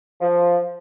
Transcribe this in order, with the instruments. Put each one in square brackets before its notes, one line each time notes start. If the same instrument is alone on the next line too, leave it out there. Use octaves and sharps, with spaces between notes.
[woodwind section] F3